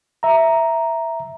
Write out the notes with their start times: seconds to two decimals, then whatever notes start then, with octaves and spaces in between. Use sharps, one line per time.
0.23 E5 A#5